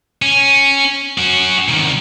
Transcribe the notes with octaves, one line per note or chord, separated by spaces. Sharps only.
C#4
C#4 F#4
C2 D#3